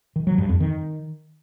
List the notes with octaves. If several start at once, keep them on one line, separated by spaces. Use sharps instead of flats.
D#3
F#3
G2
F2
D#3